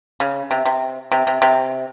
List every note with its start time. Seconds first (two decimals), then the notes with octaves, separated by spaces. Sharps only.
0.20 C#3
0.51 C3
0.66 C3
1.12 C3
1.27 C3
1.42 C3